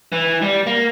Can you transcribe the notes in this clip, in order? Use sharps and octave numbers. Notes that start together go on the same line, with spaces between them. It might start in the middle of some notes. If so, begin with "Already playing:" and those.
E3
G3
A#3